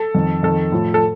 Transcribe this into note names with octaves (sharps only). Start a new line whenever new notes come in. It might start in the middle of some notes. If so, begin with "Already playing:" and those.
Already playing: A4
F2 D#3
F2 D#3 A4
A2 F3
A4